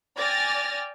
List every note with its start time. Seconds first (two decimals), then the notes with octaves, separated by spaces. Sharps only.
0.18 D5 G5 G#5 F6 A6 A#6